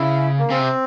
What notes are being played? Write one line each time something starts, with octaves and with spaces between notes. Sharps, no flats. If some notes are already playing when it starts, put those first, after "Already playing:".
Already playing: C#3 E4
A#3
C#3 C4
C3